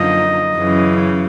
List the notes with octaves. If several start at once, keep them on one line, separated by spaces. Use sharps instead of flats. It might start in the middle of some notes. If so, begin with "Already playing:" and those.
Already playing: F#2 D3 F3 A#3 D#4 D#5
F#2 C#3 E3